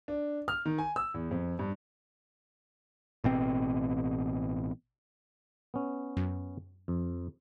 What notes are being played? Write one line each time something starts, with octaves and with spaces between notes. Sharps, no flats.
D4
F6
D#3
G#5
E6
E2
F2
G2
A1 B2 C4
B3 C#4
F#2
F2